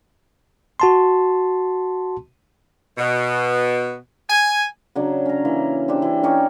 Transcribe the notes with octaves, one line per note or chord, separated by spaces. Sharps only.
F#4 A5 C6
B2
G#5
C#3 F#3 D4
C#4 A#5
E3 A#3
C4 D4 G4
E3
C#4 D#4 G4 C#5